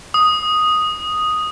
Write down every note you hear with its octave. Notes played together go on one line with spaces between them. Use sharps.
D#6